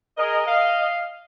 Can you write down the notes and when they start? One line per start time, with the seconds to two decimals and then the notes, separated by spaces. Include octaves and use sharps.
0.18 G#4 A#4 D#5
0.46 F5